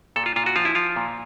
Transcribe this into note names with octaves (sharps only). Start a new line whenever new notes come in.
A#2 A4
F4
A#2 F4
F#4
F3 F4
E4
F3 F4
A#2